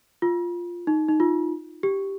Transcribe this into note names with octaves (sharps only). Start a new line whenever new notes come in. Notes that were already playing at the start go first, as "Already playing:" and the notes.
F4
D#4
D#4
F4
G4